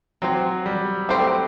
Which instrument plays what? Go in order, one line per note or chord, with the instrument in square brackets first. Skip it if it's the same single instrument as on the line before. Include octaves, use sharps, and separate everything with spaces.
[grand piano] F#3 [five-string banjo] C4 G4 C5
[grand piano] G3
[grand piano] A3 [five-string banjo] C4 G4 C5